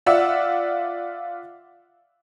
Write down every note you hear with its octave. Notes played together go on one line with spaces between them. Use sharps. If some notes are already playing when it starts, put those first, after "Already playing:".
F4 D5 E5 F#5 E6